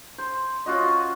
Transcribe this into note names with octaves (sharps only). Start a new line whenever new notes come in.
C5
C#4 F4 F#4 D#5